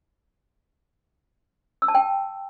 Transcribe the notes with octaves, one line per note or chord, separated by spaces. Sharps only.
E6
A5
G5